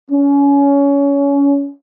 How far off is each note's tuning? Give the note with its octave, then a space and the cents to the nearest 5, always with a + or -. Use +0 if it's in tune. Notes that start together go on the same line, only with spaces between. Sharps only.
C#4 +25